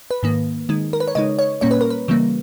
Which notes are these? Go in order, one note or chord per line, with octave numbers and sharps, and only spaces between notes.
B4
G#2 D#3 A#3
D#3 G#3 D#4
A#4
B4
C#5
C#3 G#3 D#4 D#5
C#5
A#2 G3 A#3 C#4 C#5
B4
A#4
B4
C#3 E3 G3 A#3